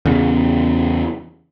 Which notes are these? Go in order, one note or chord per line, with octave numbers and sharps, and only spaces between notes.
E2 C#3